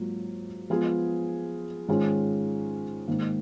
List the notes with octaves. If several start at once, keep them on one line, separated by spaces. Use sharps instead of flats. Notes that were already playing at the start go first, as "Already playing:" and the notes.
Already playing: G#2 F#3 A#3 F4
F3 G#3 B3 F4 G#4
G#2 D#3 G#3 C#4 F4
G#2 D#3 A#3